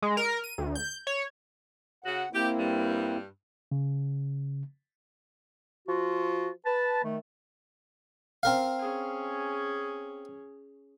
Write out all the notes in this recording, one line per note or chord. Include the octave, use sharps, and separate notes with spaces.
G#3
A#4
D#7
D2
G6
C#5
C#3 F#4 F#5
A#3 C4 E4 G4
G2 G3
C#3
F3 F4 F#4
B4 A5
D#3 A3
C4 A#4 F5
C#4 G#4